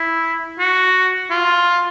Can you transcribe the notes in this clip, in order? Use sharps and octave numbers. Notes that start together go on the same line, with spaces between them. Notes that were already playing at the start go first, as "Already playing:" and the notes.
Already playing: E4
F#4
F4